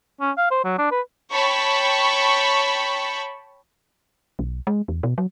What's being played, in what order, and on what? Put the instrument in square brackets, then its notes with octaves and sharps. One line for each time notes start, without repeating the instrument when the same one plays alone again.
[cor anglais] C#4
F5
C5
F#3
D4
B4
[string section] C#5 G5 A5 B5 C#6
[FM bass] B1
G#3
E2
B2
F#3